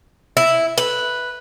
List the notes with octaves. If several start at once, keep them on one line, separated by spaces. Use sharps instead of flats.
E4
B4